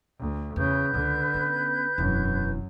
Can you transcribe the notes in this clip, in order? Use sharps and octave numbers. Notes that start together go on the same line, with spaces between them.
D2
E2 C#3 B4 G6
C#2 D3
B3 C#4
E1 F#2 E4